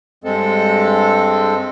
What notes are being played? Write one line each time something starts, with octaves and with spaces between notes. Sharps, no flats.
G2 G#3 C4 A4